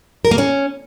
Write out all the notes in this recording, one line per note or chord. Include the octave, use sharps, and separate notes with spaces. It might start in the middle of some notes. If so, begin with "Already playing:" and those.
A#4
A#3
C#4